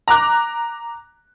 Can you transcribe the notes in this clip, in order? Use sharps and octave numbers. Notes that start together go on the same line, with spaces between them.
A#5 D6 F#6